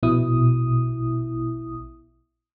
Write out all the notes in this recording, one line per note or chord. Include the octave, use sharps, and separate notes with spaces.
A#1 B2 E4 D#6